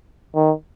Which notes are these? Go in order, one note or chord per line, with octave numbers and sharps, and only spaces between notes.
D#3